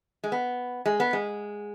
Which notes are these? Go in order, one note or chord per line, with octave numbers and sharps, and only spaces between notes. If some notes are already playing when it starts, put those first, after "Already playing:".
G#3
B3
G#3
B3
G#3